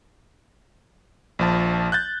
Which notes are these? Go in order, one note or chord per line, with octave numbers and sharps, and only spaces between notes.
A#1 F3 A5
F#6 G6 A6